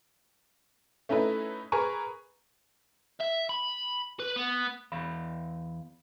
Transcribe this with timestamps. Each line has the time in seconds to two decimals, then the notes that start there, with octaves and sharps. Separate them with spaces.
1.09 A3 C#4 D#4 E4 B4
1.72 G#4 A#4 B4 G#5 A#5 C#6
3.20 E5
3.49 B5
4.20 B4
4.36 B3
4.92 E2 F5 B5